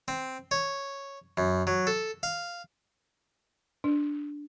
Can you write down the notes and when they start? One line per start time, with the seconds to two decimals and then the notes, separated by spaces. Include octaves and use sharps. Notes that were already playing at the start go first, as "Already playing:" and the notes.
0.08 C4
0.51 C#5
1.37 F#2
1.67 F#3
1.87 A4
2.23 F5
3.84 D4